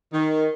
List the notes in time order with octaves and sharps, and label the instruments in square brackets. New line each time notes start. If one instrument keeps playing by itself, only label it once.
[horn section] D#3